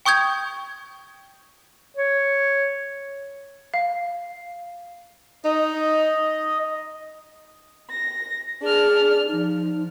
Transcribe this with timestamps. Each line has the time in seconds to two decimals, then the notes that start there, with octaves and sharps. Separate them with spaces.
0.06 G5 C#6 D#6 G6 G#6
1.96 C#5
3.74 F5
5.45 D#4 D#5
7.90 A#6
8.62 D4 G#4 F6
9.28 F3 D#4